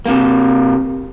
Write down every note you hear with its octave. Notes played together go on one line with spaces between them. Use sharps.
C3 A#3